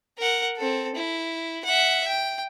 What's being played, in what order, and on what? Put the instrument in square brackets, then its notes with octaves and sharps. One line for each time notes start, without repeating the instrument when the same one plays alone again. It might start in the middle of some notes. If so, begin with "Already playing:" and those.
[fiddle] A#4 F#5
C4 A4
E4
E5 F#5
G5